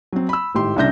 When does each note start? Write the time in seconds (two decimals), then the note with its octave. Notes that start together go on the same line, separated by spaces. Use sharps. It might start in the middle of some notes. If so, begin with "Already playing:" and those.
0.13 F#3 C4
0.29 B5 E6
0.55 G#1 A2 G4 C6
0.76 C2 C#3 D4 E5 G6 A#6